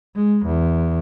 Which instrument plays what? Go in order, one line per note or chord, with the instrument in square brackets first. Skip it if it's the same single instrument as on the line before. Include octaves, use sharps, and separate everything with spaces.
[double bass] G#3
E2